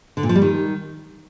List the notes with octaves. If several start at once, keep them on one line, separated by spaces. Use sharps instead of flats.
D3
A#2
F3
G3
D#3